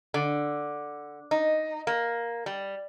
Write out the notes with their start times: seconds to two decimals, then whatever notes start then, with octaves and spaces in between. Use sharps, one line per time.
0.14 D3
1.31 D#4
1.87 A#3
2.46 G3